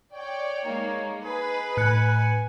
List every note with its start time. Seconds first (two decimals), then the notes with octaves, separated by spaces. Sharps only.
0.14 C#5 D5 G5
0.67 G#3 A#3 D#4
1.25 D#4 G#4 B4
1.77 A2 G#5 F#6 C#7